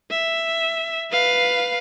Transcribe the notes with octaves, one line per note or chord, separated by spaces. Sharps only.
E5
B4 F5